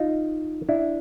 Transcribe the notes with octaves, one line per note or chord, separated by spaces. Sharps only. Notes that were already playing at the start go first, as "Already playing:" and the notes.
Already playing: D#4 F4
D4 E4